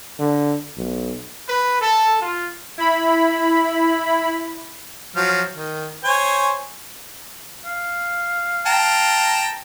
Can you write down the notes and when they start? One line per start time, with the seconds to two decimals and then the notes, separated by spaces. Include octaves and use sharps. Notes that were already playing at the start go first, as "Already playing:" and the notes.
0.19 D3
0.77 B1
1.46 B4
1.79 A4
2.20 F4
2.78 E4 B5
5.16 F3 F#3 F6
5.54 D#3
6.04 C5 C#5 G#5
7.65 F5
8.66 G5 A5 A#5